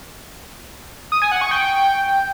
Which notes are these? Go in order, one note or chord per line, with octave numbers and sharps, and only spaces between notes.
D#6
G#5
F#5
C#6
G5